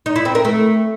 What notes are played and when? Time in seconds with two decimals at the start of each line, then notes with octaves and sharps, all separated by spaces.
0.06 D#4
0.16 E4
0.25 C4
0.35 A#4
0.45 A3